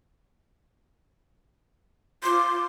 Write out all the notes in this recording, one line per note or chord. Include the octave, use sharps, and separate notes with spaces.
F4 C6 D6